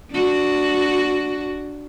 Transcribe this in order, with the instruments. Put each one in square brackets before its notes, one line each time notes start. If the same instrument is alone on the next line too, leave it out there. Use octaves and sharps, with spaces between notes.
[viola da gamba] D4 F#4